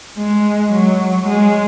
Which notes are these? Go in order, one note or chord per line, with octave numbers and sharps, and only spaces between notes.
G#3
F#3
G#3